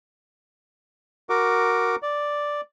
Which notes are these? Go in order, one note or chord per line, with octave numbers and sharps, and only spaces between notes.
F#4 A#4 D6
D5